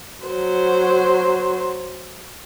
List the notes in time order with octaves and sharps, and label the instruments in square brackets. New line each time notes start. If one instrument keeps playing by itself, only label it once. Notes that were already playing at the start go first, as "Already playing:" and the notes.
[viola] F#3 C5